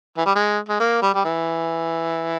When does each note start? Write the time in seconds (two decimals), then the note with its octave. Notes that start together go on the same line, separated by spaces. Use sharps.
0.17 E3
0.26 G3
0.35 G#3
0.69 G#3
0.80 A#3
1.02 G3
1.14 G3
1.25 E3